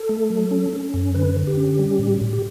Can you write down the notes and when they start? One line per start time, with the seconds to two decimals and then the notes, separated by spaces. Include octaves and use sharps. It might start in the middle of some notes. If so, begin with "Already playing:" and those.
Already playing: A4
0.09 A3
0.30 F#3
0.51 C#4
0.73 C#4
0.94 F#2
1.14 D3 B4
1.36 D3
1.47 G4
1.57 C#4
1.79 G3
1.99 A2
2.21 A2
2.33 G4